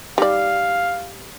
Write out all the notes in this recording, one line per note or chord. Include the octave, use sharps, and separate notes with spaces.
G3 D#4 D5 F5